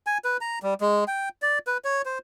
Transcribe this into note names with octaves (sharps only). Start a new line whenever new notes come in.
G#5
B4
A#5
G3
G#3
G5
D5
B4
C#5
C5